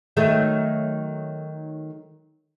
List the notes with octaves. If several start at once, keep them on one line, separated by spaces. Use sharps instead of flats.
D#3 F#3 A3